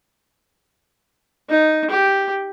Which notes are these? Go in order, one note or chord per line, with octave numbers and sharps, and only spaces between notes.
D#4
G4